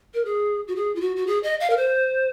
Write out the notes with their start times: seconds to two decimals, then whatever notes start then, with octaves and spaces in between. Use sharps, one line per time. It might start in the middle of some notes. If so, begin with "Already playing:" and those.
0.14 A#4
0.25 G#4
0.68 F#4
0.76 G#4
0.95 F4
1.01 F#4
1.16 F#4
1.27 G#4
1.43 D#5
1.60 F5
1.70 A#4
1.77 C5